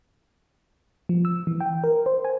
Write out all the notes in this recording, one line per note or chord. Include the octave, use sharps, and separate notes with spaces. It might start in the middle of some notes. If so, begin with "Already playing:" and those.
F3
E6
E3
G5
A#4
C5
G#5